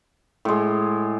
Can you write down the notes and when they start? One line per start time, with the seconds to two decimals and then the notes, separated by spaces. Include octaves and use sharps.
0.45 A2 G#3